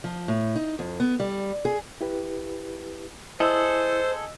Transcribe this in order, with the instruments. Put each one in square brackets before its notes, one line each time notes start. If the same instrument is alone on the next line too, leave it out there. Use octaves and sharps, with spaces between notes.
[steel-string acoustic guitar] F3
A2
D#4
F2
B3
G3
G#4
[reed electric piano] E4 G4 B4
[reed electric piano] E4 [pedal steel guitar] G#4 A4 [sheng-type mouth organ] C5 [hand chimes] D#5 E6